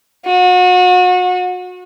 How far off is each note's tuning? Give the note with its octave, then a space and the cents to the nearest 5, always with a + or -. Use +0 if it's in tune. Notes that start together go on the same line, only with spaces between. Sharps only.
F#4 -35